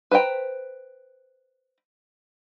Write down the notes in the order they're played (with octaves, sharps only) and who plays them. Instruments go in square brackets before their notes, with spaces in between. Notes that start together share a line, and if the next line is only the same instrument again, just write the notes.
[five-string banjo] B4 C5 F5 G5 A#5